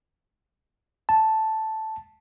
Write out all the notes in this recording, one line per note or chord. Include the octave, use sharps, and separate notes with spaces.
A5